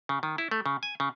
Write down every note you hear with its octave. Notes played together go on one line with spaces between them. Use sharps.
C#3
D#3
E4
A3
C#3
G#5
C#3